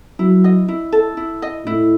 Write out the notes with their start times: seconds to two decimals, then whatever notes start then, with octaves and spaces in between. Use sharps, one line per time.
0.19 F#3 E4
0.44 D#5
0.68 E4
0.92 A4
1.17 E4
1.42 D#5
1.66 A2 E4